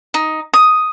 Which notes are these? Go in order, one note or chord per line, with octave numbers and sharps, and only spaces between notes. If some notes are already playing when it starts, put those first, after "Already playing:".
D#4
D#6